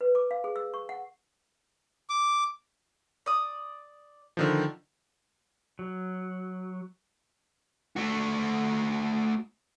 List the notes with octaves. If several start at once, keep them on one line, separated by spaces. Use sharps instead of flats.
B4
D6
F5
G#4
E6
C#6
F#5
D6
D5 D#6
D3 D#3 F3
F#3
A3 F#4